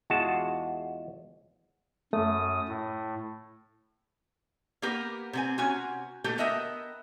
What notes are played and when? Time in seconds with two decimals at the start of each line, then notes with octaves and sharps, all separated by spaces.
0.10 E2 G#3 F4 F#4 A5
2.13 F#2 A3 D#6
2.68 A2
4.82 A#3 B3 G4 A#4 A#5
5.33 C3 C4 G#5
5.58 C3 C#4 F#4 G#5
6.24 B2 A3 A#3 G4 A4
6.38 B3 A#4 D#5 E5 F#5 G5